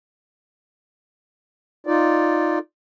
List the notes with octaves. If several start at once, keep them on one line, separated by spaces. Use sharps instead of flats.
D#4 F4 D5